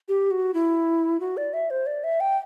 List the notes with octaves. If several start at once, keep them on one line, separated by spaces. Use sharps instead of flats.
G4
F#4
E4
F#4
D5
E5
C5
D5
E5
G5